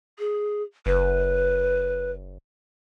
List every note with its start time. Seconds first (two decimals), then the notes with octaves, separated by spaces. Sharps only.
0.19 G#4
0.86 F#1 B4